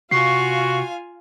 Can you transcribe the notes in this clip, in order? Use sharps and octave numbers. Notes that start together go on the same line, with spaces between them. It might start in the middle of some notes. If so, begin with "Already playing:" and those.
C3 F4 F#4 F5 G#5 C#6 C7